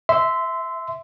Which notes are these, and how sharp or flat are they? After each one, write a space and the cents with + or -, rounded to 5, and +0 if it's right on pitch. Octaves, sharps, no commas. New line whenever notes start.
E5 -5 C6 -20